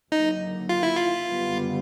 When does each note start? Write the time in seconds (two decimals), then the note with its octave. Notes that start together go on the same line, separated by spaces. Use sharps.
0.11 F#1 F#2 D3 F#3 A#3 D#4
0.69 F4
0.83 E4
0.96 F4
1.27 F#1 F#2 D3 G3 B3